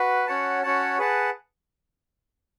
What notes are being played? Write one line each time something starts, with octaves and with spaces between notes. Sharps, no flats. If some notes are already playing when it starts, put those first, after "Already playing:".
Already playing: F#4 B4
C#4 F#4 C#5 F#5 A5
C#4 F#4 C#5 F#5 A5
G#4 B4 F#5 A5